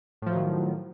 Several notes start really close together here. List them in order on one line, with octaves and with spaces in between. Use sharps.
A2 F3 F#3 D#3